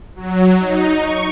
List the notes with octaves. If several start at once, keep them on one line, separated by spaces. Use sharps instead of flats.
F#3
D#4
C#6